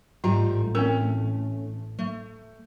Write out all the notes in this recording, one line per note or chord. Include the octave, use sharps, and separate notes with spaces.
A1 G#2 G3 A3 F4 A#5
C4 C#4 A#4
A3